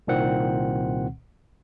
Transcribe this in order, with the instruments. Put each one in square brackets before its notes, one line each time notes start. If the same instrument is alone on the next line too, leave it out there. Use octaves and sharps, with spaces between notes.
[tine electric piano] C2 A#2 D#3 C4 F#5